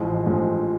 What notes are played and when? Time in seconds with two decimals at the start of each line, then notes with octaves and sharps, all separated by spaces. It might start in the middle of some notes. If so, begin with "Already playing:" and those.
Already playing: A1 A2 F3 G#3
0.26 A1 A2 F3 G#3